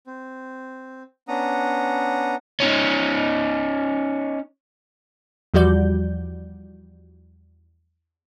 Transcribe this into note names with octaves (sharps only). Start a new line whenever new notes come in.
C4
B3 C#4 D4 F#5 A#5 D#6
C#4 D#4
E2 F3 G3 F#4 D5 G6